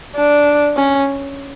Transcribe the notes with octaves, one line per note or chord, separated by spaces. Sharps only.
D4
C#4